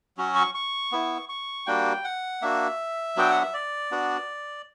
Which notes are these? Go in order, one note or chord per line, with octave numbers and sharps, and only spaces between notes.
F#3 C#4 F#4
C#6
C#6
B3 E4
C#6
G3 A#3 D4 F#4 G5
F#5
A#3 D4 F#4 E5
F#3 B3 D4 F#4 G5
F#5
E5
D5
B3 D4 F#4